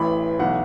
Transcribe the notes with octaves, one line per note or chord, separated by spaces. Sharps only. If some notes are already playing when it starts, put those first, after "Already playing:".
Already playing: A1 A2 E3 B5
B1 A2 E3 F#5